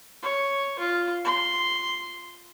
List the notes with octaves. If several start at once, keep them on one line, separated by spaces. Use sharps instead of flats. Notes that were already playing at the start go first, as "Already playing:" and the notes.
C#5
F4
C6